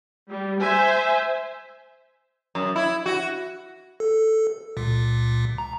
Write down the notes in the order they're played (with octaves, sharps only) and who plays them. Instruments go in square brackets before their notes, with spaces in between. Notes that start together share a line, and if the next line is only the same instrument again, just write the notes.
[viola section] G3
C5 E5 G#5
[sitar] F#2
E4
F#4
[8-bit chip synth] A4
C#2 A#2
A#5